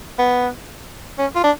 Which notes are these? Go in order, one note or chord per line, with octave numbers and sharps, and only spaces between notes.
B3
C#4
F4
D4